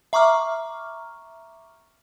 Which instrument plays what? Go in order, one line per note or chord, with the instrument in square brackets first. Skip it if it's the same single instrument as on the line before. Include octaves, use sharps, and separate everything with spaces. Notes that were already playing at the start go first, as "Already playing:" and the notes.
[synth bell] E5 A#5 C#6 D6 F6